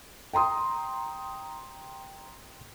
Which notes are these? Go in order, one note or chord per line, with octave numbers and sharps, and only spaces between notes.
G5 A#5 C6 D#6